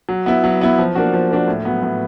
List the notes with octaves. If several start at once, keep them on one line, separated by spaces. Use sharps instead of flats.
F#3
B3 E4
F#3
B3 E4
F3
A#3 D4 F#4
F3
A#3 D4 F#4
A2
F#3 B3
A2